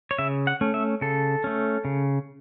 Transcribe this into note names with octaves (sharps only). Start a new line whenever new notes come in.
C#5
C#3 E5
F#5
A3 C#4
E5
C#3 A4
A3 C#4
C#3